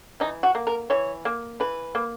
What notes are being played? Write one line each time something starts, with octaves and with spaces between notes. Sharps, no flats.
E3 D#4
F#4
A#3
A#4
E3 C#5
A#3
E3 B4
A#3